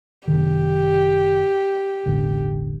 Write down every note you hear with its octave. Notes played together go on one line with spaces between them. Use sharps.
F#1 C3 D#3 G4
E1 A1 D3